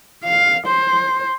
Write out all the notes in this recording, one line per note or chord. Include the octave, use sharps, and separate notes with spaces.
F5
C5